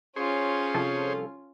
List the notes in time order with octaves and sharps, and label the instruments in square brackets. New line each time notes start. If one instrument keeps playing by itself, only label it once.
[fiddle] C#4 F4 [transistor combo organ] G#4 C5 C#5
[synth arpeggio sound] C2 F3 A4